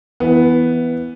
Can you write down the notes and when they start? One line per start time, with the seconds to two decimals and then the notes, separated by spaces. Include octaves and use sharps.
0.20 E3 B3